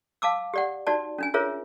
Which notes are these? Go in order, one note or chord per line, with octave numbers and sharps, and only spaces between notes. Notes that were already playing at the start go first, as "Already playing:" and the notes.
F5 A5 D6 E6
G4 D5 F#5
D#4 F#4 D5 A5
C#4 D4 G#5
F4 G#4 A#4 C5 C#5 E5